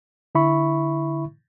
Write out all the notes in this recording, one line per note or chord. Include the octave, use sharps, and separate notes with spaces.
D3 E4 E5 B5 C#6